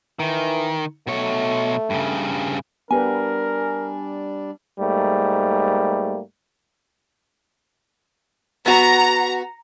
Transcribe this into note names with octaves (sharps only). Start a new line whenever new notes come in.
D#3 E3
B2 A3 C#5
G2 C#3
G3 B3 D4 G4 A#4 B4 G#5
G#2 G3 A3 A#3
B3 F#4 A#5